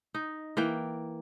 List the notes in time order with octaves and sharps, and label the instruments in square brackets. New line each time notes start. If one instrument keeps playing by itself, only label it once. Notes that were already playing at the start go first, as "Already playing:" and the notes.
[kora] D#4
E3 A#3 G5